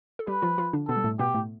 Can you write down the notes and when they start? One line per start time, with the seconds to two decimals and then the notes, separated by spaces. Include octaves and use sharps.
0.19 A4
0.27 G3 G4 B4
0.42 F3 F4
0.58 F3 F4
0.73 D3 D4
0.88 B2 B3 A4
0.96 G3
1.04 A2 A3
1.19 B2 B3 G4
1.34 A2 A3